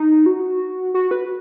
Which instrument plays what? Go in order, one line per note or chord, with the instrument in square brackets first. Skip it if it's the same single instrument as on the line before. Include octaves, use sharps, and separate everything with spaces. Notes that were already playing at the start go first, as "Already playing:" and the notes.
Already playing: [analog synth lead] D#4
F#4
F#4
B4